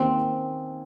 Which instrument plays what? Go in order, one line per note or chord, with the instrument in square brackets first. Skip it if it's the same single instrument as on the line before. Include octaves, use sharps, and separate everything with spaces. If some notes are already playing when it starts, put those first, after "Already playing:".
Already playing: [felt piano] D#2 D#3 A#3 C#4 G4 [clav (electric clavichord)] C4